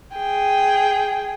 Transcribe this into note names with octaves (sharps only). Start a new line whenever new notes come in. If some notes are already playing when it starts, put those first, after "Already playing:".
G#4 G5